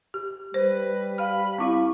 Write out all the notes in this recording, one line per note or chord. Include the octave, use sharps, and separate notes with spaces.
G4
G3 B4 C5
F5 B5 F6
C4 E4 F5 C#6